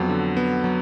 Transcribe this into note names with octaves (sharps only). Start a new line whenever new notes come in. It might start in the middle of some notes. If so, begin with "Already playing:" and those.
Already playing: F2 F#3 B3
D3
B3
F#3